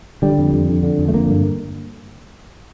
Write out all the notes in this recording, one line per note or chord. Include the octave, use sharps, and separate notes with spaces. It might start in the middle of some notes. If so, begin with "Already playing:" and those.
D3 G3
F2
F2
D3
D3
F2
A3
D3 A#3
G2